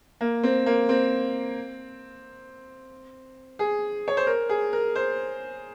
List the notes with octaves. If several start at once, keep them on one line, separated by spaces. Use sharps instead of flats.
A#3
C4
A#3
C4
G#4
C#5
C5
A#4
G#4
A#4
C5